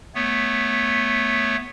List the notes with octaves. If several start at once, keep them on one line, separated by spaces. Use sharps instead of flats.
A3 B3 C#5